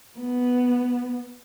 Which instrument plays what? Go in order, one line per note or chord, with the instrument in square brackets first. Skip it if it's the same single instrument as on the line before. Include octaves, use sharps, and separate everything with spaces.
[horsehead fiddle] B3